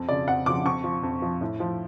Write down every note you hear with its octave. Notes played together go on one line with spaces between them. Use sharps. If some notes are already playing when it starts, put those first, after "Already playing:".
Already playing: F2
C#3 F3 D5
F2 F#5
C#3 F3 D6
F2 C#6
F3
F2
F3
A2
F3